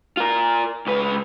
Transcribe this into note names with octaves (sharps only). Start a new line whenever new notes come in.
F4 A#4
C#2 B4